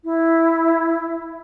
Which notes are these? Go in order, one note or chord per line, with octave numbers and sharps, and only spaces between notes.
E4